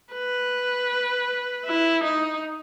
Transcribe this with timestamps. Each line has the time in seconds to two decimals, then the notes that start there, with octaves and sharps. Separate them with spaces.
0.13 B4
1.65 E4
2.03 D#4